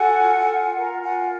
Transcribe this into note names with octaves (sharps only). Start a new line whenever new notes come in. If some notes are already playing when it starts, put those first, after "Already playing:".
Already playing: F#4 A4 F#5 G#5
F4
F4
A#4
F4 F#5 G#5